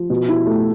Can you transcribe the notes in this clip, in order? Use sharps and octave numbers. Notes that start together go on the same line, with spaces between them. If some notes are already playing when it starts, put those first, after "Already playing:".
Already playing: F3
B2
E4
A3